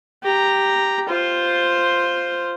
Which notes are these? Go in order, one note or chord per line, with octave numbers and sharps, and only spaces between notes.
G4 A#5
F4 C5